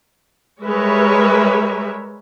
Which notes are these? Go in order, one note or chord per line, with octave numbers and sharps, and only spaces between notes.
G3 G#3 A#4 B4 C#5 E5